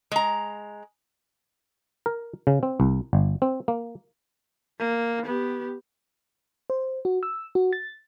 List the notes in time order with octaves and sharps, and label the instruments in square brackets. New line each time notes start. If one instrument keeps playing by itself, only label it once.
[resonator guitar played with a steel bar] G#3 A#5
[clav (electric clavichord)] A#4
C#3
C4
C2
G1
C4
A#3
[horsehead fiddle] A#3
B3 G4
[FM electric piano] C5
F#4
E6
F#4
A6